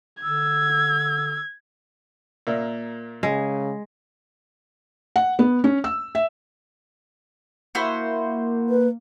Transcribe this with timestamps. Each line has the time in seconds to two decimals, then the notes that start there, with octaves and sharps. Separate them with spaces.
0.23 D3 E6 G#6
2.47 A#2 A#3 E5
3.23 C#3 G#3
5.16 F#5
5.39 B3
5.64 C#4
5.84 E6
6.15 E5
7.75 A#3 E4 F#4 C5
8.70 B4